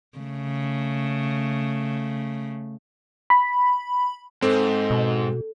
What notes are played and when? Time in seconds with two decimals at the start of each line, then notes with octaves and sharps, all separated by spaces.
0.18 C#3 A3
3.30 B5
4.42 G#2 C4 A4
4.90 B2